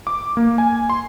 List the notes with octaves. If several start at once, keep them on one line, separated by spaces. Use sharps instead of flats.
D6
A#3
G#5
C6